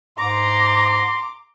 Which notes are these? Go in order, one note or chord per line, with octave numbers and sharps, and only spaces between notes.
G#2 A#5 C6 D6 A#6